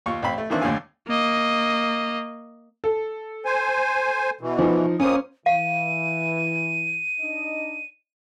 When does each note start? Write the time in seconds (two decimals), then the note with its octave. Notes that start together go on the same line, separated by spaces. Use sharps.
0.06 D#2 F4 C#6
0.22 A1 C4 F5 B5
0.38 A3
0.50 D#3 E3 A#3 C4 D4 E4
0.61 D#2 A2 D3 F5 G#5
1.07 A#3 D#5
2.84 A4
3.45 C5 G#5
4.41 B2 E3
4.59 F3 D#4
5.00 F2 A#3 C#4 C5 D#6
5.46 E3 F5 D#7
7.20 D4 D#4 D#5